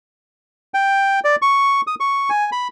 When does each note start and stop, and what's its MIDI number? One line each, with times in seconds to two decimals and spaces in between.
0.74 1.20 79
1.24 1.36 74
1.42 1.81 85
1.87 1.95 87
2.00 2.30 85
2.30 2.50 80
2.52 2.68 83